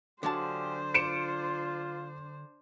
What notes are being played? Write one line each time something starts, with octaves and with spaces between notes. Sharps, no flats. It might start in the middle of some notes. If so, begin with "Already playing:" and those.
D3 F#3 D4 F4 G4 G#4 C5 A5
F4 C#7 D7 E7